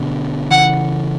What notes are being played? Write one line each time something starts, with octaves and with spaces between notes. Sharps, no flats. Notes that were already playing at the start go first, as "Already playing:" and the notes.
Already playing: B2 D3
C#3 E3 F#5